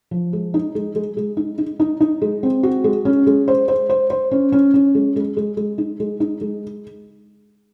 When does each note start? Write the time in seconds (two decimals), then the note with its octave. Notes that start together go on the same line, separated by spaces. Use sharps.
0.11 F3
0.33 G#3
0.54 D#4
0.75 G#3
0.96 G#3
1.17 G#3
1.37 D#4
1.58 D#4
1.80 D#4
2.00 D#4
2.22 G#3
2.43 C4
2.63 F#4
2.84 G#3
3.05 C#4
3.27 G#3
3.48 C5
3.68 C5
3.89 C5
4.10 C5
4.31 C#4
4.52 C#4
4.74 C#4
4.95 G#3
5.16 G#3
5.37 G#3
5.57 G#3
5.78 D#4
6.00 G#3
6.20 D#4
6.41 G#3